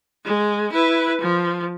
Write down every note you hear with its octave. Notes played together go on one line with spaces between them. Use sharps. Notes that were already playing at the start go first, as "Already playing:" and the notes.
G#3
E4 B4
F3